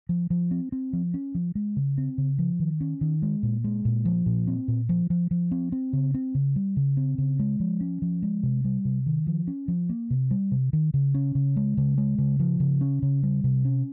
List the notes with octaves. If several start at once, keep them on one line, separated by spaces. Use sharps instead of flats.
F3
F3
C4
C4
F3
C#4
F3
G#3
C#3
C4
C#3
F3
D#3
C#4
D#3
G#3
A#2
G#3
A#2
F3
A#2
C4
A#2
F3
F3
F3
C4
C4
C#3
C4
C#3
G3
C#3
C4
C#3
G#3
F3
C#4
F3
G#3
C3
G3
C3
D#3
F3
C#4
F3
A#3
C3
G3
C3
D#3
C#3
C#4
C#3
G#3
C#3
G#3
C#3
F3
C#3
C#4
C#3
G3
C3
C#4